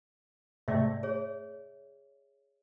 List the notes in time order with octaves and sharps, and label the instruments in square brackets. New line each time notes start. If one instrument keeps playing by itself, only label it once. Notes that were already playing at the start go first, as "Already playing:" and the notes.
[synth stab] G#2 C3 A3 [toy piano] D5 E5
[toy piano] G#4 C#5